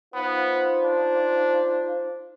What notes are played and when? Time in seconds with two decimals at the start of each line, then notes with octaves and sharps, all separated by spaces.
0.14 B3 D#4 F4 C5
0.83 D4